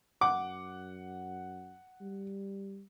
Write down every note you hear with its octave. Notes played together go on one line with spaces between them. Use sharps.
F#2 F#5 D6
G3